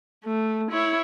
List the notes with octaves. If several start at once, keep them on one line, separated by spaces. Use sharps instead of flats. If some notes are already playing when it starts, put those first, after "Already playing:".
A3
E4 C#5